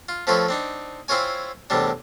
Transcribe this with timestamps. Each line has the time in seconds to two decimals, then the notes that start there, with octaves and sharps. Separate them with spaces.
0.09 F4
0.27 F3 A3 C4 F4 B4 C#5
0.48 C4 D4 D#4
1.08 C4 E4 F4 A#4 C#5 G#5
1.70 E2 A2 C3 G3 D4